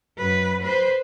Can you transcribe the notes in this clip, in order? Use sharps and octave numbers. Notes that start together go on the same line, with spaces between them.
F#2 B4
B4 C5